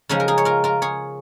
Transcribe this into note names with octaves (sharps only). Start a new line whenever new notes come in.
C#3 F3 G#3 C#4 D#4 G#4
A#4
D#4 G#4
C#5
F4 A#4
F4 A#4
G#4 C#5